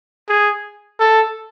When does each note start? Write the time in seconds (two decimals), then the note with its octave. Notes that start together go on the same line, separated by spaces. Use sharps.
0.28 G#4
1.00 A4